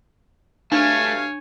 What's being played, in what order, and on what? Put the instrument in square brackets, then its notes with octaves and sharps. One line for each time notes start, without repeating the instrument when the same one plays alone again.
[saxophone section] D2 G2 F5 [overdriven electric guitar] A3 [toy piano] D4 [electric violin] C#5 G#5